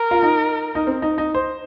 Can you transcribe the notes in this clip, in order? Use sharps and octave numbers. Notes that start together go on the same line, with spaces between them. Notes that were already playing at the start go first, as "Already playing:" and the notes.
Already playing: A#4
F4
D#4
D#4
C4
D#4
D#4
C5